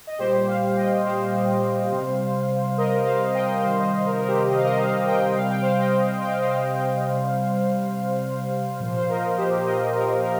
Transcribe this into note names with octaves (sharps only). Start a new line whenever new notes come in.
D#5
A#2 G3 G4 C5
C5 F5
D#5 G5
C5 F5
C3 G3
A#4 D#5
C5 F5
D#5 G5
C3 D#3 G3 C5 F5
D#5
C5
A#4
A#4
G4 C5
D#5
F5
A#4 D#5
C5 F5
D#5 G5
C3 G3 F5
G5
C5 F5
D#5 G5
G5
F5
D#5
C5 F5
C3 G3
A#2 F3
C5
A#4 D#5
G4 C5
A#4 D#5
A#4
A#4